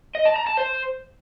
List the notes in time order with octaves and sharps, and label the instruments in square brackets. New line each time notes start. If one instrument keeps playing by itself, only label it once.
[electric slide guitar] D#5
A5
A#5
A5
C5